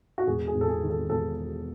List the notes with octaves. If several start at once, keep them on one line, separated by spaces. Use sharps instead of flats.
F#4
E1 G#4
G#4
E1
A4
G#4
D#3
A4
E1 A4